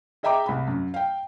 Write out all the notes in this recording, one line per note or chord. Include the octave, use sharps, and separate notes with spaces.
G#4 D#5 E5 G5 A#5 D6
C2 B5
F#2
F5 G5